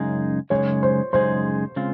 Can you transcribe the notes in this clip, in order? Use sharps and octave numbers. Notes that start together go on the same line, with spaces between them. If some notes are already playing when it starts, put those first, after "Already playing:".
Already playing: F#2 C#3 G#3 D#4 G#4
F#2 C#3 G#3 D#4 G#4 C#5
C5
F#2 C#3 G#3 D#4 G#4 C5
C#3 G#3 C4 F4